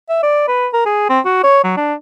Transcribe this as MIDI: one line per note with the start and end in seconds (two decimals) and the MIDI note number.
0.09 0.18 76
0.23 0.44 74
0.48 0.68 71
0.73 0.82 70
0.86 1.07 68
1.09 1.20 60
1.25 1.40 66
1.43 1.62 73
1.64 1.74 54
1.77 1.94 62